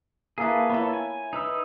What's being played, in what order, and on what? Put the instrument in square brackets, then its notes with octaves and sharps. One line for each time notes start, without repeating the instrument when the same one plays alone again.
[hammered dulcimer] A#3 E4 [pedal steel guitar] G#4 A4 B4
[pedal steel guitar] B3 A4 [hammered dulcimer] E4 C#5 B5
[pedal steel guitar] G#5
D#4 B4 E6